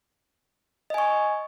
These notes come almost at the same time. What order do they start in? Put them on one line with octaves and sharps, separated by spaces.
D#5 G#5 C#6